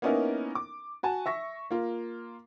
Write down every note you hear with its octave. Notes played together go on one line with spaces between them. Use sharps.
A#3 B3 C#4 D#4 E4 A#4
D6
F#4 G#5 A5
E5 C#6 A#6
A#3 F4